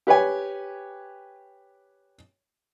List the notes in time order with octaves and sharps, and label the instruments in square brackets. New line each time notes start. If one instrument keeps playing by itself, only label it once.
[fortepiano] G4 B4 C#5 G#5